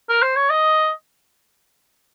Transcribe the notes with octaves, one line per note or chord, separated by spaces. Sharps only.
A#4
C5
C#5
D#5